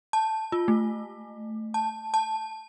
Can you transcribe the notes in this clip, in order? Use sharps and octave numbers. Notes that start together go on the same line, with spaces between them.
A5
F4
A3
A5
A5